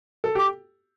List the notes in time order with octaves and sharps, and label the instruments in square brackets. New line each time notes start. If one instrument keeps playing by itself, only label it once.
[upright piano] A4
[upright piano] G4 [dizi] D6